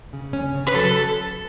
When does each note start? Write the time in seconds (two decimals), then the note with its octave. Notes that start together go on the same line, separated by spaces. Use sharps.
0.13 C#3
0.33 C#4
0.55 C#3
0.68 B4
0.76 F#3 A4